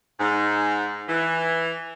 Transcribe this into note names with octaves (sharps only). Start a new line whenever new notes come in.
G#2
E3